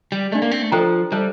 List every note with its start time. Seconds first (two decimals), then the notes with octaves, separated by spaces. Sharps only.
0.12 G3
0.32 A3 D4 G4 D5
0.42 A#3
0.51 C4
0.62 A3
0.72 F3 A4 C5 G5 A#5
1.12 G3 A4 C5 E5 A5